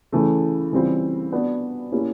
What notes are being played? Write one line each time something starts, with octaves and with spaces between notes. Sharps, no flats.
C#3 E3 A3
C#3 E3 G3 C4 F4
B3 D4 F#4 B4 D5
A#3 C#4 E4 G4